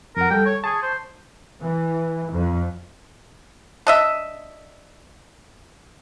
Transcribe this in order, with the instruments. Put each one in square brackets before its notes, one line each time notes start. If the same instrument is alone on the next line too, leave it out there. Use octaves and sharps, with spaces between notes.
[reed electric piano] F2 F#5 [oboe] A#4
[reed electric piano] G3 A4 [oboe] G5
[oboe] C#5
[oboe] G#4 [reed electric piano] A5 C#6 G#6
[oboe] C5
[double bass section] E3
F2
[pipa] D4 D#5 E5